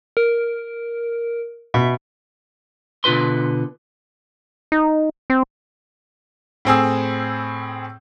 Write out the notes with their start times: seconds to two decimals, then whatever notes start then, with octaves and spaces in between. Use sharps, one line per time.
0.17 A#4
1.74 B2 E5
3.04 B2 D3 F4 B4 C6
4.72 D#4
5.30 C4
6.65 A2 C4 G#4 E6